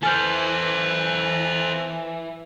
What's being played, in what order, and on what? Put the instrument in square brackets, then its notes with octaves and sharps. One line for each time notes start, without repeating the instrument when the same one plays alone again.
[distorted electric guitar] E3 [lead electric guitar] A4 C5 [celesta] G#5 F6 G6